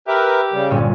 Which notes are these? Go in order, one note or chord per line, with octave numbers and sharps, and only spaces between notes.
G4 A#4 B4 E5
C#3 G3
G1 A#2 C#4